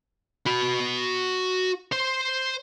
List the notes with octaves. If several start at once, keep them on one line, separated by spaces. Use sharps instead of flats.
F#4 B5
C5